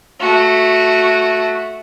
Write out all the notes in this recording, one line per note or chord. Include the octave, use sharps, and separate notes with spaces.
A3 F#4